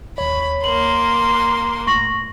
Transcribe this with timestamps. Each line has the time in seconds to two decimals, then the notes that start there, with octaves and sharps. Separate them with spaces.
0.18 D#2 C#5 B5
0.64 A#3 C6 F#7
1.35 F#6
1.87 A2 C#6 A#6 F#7